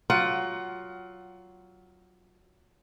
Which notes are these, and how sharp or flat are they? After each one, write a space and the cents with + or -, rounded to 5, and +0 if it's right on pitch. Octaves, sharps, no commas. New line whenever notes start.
F#3 +15 F4 +15 F#5 +25